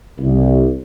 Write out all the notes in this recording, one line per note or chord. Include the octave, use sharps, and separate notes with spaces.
C2